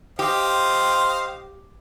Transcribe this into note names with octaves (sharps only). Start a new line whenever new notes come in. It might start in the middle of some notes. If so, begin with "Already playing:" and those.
G4 C5 D#5 F5 G5